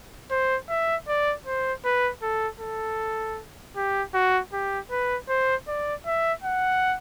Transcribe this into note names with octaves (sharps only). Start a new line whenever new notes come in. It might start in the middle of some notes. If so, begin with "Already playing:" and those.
C5
E5
D5
C5
B4
A4
A4
G4
F#4
G4
B4
C5
D5
E5
F#5